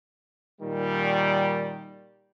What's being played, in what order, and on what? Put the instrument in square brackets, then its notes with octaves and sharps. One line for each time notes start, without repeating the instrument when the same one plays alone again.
[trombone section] A#2 D#3 G3